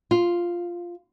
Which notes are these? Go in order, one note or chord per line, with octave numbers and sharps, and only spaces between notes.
F4